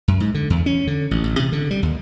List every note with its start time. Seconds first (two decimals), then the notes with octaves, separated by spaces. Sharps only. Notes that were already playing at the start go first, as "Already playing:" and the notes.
0.08 F#2
0.20 G#2
0.35 D3
0.50 E2
0.66 C#4
0.87 D3
1.11 A1
1.24 A1
1.40 C3
1.52 D3
1.71 G3
1.83 D#2